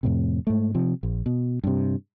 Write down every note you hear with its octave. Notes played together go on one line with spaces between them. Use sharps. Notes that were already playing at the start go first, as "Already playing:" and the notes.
F2 A2 C3
G#2 A3
C3 F3
A#1
B2
G2 C3